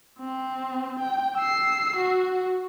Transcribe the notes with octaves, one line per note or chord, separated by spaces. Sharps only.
C4
G5
E6 C7
F#4